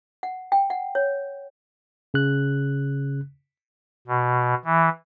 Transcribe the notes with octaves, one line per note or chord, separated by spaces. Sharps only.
F#5
G5
F#5
C#5
C#3 F#6
B2
E3